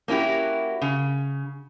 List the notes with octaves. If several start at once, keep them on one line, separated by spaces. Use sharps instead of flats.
A#3 C#4 E4 F#4 G4
C#3